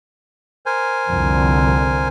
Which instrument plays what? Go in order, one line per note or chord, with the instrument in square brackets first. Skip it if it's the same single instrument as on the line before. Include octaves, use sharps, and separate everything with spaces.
[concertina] A#4 C5 G#5
[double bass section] C2 F2 D3